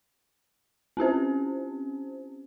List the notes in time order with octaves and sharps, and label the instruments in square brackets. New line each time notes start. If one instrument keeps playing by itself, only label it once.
[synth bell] C4 C#4 G4 C5